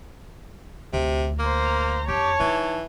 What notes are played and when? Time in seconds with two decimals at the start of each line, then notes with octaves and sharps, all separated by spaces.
0.93 D2 C3
1.39 A#3 C5 A#5
2.08 F2 G4 C#5 A5
2.40 E3 D#4